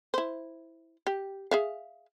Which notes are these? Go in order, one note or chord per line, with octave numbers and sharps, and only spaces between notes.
E4 C5
G4
G#4 E5 F5